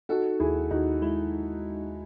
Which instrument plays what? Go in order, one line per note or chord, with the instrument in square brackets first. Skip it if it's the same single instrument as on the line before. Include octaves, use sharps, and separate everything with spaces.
[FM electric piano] D#4 [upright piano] F#4 A4
[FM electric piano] D#2 [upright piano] E4 G#4
[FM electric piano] D#2 [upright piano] D#4 F#4
[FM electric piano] G#3 [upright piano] E4